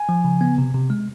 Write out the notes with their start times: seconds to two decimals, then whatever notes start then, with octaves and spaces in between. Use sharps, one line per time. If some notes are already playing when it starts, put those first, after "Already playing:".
Already playing: G#5
0.09 F3
0.25 C#3
0.41 B3
0.58 C3
0.74 C3
0.90 G#3